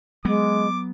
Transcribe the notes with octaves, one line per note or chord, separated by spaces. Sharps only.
F#3 G#3 B3 D6